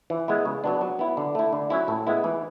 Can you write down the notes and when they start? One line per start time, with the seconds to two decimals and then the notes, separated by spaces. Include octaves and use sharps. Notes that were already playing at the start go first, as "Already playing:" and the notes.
0.10 E3
0.28 G#3 B3 E4
0.45 C#3
0.64 F#3 B3 D4
0.81 F#3
0.99 B3 E4
1.17 D3
1.35 A3 E4
1.53 D3
1.70 F#3 C#4 E4
1.88 A2
2.07 G#3 B3 E4
2.24 E3